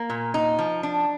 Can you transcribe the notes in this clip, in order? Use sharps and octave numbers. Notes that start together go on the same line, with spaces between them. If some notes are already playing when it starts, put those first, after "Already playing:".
Already playing: A#3
A#2
D#4
F3
D4